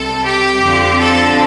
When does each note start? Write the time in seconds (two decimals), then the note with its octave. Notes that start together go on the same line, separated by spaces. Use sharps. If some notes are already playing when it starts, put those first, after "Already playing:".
Already playing: C2 C3 G3 C4 A4
0.24 G4
0.62 F2 D3 F3 C4
1.00 A4